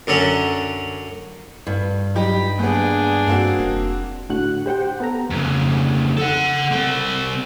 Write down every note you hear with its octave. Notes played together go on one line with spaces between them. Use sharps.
F#2 D3 F#3 C#4
G2
F#3 D#4 G4 B5
G1 A#3 B3 D4 G#4
G2 A#3 C4 F#4
F1
A2 D3 F#4 F#5 F#6
G4 C5 F#5 G5
B3 A4 A#5
F2 C#3
A4 F#5
G3 C4